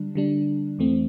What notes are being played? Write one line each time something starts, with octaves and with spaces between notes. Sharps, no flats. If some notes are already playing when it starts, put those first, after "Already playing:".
Already playing: D3 G3 D4
D3 G3 D4
E2 E3 A3 C4